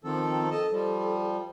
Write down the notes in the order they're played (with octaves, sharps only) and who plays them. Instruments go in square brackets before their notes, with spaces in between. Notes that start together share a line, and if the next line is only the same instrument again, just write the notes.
[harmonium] D#3 F3 A4 [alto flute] C4
[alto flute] A4 [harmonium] D#5 A5
[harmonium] F3 G3